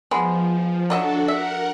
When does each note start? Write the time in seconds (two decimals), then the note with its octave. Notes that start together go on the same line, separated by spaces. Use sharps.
0.11 F3 G#3 B3
0.90 F#3 D4 F#4 A4 D#5 E5
1.28 A#4 E5 F#5